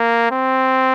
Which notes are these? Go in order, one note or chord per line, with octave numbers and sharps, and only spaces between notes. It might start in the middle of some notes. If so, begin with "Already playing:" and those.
Already playing: A#3
C4